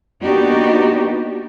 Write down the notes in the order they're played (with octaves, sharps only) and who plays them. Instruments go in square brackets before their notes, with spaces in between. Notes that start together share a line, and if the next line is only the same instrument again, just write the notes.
[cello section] A#3 B3 D4 D#4 F#4 G4